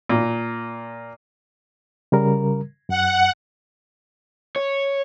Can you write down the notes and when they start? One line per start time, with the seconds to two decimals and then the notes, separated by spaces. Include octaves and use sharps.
0.10 A#2
2.12 C#3 G3 A#4
2.89 F#2 F#5
4.56 C#5